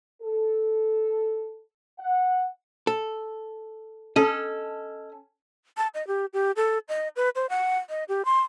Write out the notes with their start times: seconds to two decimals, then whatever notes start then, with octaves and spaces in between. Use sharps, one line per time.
0.22 A4
1.99 F#5
2.87 A4
4.16 C#4 A4 D#5
5.77 A5
5.94 D#5
6.07 G4
6.33 G4
6.56 A4
6.89 D#5
7.16 B4
7.35 C5
7.50 F#5
7.90 D#5
8.09 G4
8.25 C6